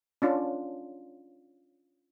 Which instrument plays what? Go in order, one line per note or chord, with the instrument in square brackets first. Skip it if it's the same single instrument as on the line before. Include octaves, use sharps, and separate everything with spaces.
[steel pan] C#4 D4 F4